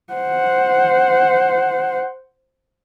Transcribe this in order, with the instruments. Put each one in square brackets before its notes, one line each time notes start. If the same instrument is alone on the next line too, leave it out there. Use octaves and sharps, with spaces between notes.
[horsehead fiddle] C5 F#5